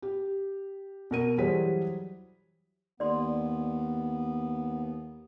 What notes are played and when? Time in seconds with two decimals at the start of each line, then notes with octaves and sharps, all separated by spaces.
0.02 G4
1.11 B2 A#4 D#7
1.38 E3 F#3 G3 G#4 C5 B6
3.00 D#2 B3 D5 C6